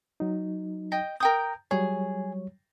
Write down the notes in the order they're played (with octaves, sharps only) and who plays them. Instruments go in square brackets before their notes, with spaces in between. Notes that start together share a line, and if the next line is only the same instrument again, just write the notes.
[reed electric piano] F#3 D#4
[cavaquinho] D#5 G5
[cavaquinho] A#4 G5 D#6 [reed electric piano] G6
[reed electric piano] F#3 G3 C#5 [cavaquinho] G#4